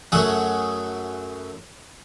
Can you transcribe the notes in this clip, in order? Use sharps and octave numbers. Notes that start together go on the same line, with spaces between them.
F#2 F#3 A3 G#4 F#5 D#6